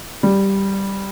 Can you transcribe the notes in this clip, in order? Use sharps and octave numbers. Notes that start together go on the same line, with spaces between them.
G3